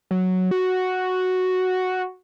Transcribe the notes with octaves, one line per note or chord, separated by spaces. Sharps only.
F#3
F#4